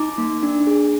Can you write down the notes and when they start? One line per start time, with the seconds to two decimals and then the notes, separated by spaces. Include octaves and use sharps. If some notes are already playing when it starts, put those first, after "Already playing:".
Already playing: D#4 A#5 D6
0.18 A#3
0.43 D4
0.67 G#4